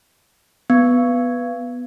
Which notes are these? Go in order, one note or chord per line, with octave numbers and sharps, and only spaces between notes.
B3